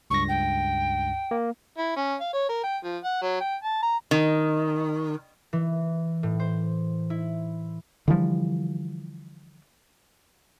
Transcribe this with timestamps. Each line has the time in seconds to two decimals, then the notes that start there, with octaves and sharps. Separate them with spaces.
0.10 C#2 G2 C#6 A#6
0.28 G5
1.31 A#3
1.78 E4
1.96 C#4
2.21 F5
2.34 C#5
2.49 A#4
2.64 G5
2.84 F3
3.04 F#5
3.22 F#3
3.41 G5
3.64 A5
3.82 A#5
4.11 D#3
5.53 E3
6.23 A2
6.39 C5
7.10 E4
8.08 D3 E3 F3 G3